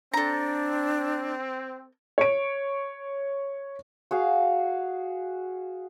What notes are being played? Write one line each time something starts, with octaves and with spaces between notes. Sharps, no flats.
C4 D4 A4 A#5
C#5 D7
F#4 G#4 F5